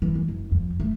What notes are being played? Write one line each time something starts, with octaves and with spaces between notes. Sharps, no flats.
E3
G#3
F#1
F2
A3